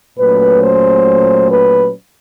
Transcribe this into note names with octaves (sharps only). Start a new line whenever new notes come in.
A#2 F#3 A3 C#4 B4
C5
B4